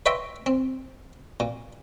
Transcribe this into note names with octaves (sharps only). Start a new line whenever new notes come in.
B4 C#5 D#5 E5 G5 C6
C4
A#2